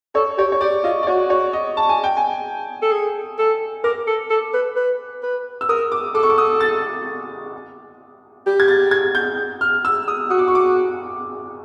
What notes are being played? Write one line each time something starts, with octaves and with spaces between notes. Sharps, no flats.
A4 C#5
G4 C#5
C#5
G4 D5
F4 D#5
D5
F#4 C#5
C#5
D#5
A5
G#5
G5
G#5
A4
G#4
A4
A#4 D6
A4
A4
B4
B4
B4
E6
A#4 D#6
D6
A4 D6
C#6
D6
D#6
A6
G4
G#6
A6
G#6
G6
F6
E6
D#6
F#4 D#6
D6
C#6
D6